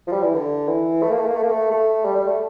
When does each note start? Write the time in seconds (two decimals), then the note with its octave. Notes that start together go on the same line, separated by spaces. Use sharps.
0.08 F3
0.12 G3
0.23 E3
0.35 D3
0.68 E3
1.02 A3
1.10 A#3
1.19 A3
1.26 A#3
1.35 A3
1.43 A#3
1.50 A3
1.71 A3
2.05 G3
2.16 G3
2.28 A3